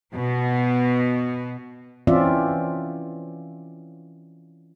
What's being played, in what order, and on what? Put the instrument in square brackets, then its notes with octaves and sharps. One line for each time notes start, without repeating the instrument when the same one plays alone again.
[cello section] B2 B3
[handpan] E3 C4 C#4 F4 D5 E5